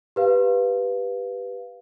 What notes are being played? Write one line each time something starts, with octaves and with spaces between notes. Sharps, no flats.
G4 B4 F5